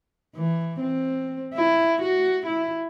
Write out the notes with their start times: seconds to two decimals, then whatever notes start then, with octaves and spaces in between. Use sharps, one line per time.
0.36 E3
0.80 C4
1.54 E4
2.02 F#4
2.46 E4